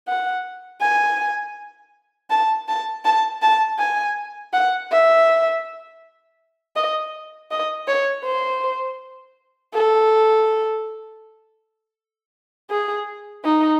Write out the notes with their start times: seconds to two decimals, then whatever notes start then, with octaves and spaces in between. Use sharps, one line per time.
0.08 F#5
0.82 G#5
2.30 A5
2.68 A5
3.05 A5
3.42 A5
3.79 G#5
4.54 F#5
4.91 E5
6.76 D#5
7.51 D#5
7.88 C#5
8.25 C5
9.74 A4
12.70 G#4
13.44 D#4